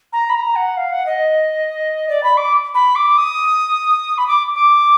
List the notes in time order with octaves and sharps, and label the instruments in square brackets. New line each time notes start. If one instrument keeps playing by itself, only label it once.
[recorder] A#5
B5
A#5
F#5
F5
F#5
D#5
D5
B5
D6
B5
D6
D#6
B5
D6
D6